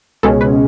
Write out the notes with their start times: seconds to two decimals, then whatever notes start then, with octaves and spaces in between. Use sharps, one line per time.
0.23 C#2 B2 G#3 C#4 A4
0.41 B4